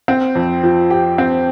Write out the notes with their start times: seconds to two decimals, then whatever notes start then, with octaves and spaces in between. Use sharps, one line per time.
0.08 C4
0.35 F2
0.63 F3
0.90 G4
1.18 C4